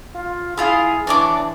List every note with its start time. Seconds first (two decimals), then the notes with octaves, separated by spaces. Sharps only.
0.15 F4
0.58 E4 F4 G#4 F5
1.07 E3 D4 C#5 D6